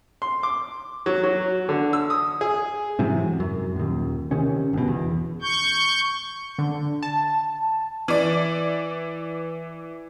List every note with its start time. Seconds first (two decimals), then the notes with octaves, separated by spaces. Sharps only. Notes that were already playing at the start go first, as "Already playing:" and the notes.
0.22 C6
0.43 D6
1.06 F#3
1.24 F#3
1.69 D3
1.93 E6
2.10 D#6
2.41 G#4
2.99 G#2 C3 E3 F#3
3.40 F#2
3.76 D#1 D#2
4.31 C3 D#3 C#4
4.73 G1 B2
4.88 E2
5.42 C#6 G6
6.59 D3
7.03 A5
8.08 E3 D5